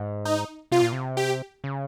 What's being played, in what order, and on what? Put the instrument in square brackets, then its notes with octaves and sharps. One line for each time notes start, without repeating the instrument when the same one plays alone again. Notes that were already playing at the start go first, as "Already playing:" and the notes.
Already playing: [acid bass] G#2
[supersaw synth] D#4
[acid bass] C3 [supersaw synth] F4
[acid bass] A#2
C3
[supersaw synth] G4
[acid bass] C#3